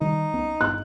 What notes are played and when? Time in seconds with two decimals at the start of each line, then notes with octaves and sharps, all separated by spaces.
0.01 D#3 F#3 G3 D#4
0.33 C2 B3 C#4
0.61 G#1 G2 B3 F#6